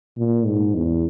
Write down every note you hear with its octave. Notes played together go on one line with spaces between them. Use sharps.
A#2
G#2
E2